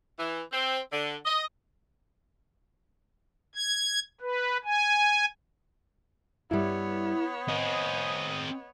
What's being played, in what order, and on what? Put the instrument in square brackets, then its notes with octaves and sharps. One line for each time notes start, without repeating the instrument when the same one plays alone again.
[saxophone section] E3
C4
D3
D#5
[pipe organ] G#6
B4
G#5
[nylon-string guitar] G2 G3 [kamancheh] B3 C#5 [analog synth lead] E4
[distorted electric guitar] C4 G#4 [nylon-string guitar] D#5 [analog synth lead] D#6